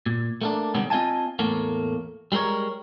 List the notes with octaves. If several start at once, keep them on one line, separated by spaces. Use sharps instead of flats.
A#2
A3 A#3 D4
C3 D#3 G3 G#3 B3 C#4
C4 F4 D#5 F5 G#5 A5
E2 A2 A3 A#3
G3 G#3 D#4 A#4 C#5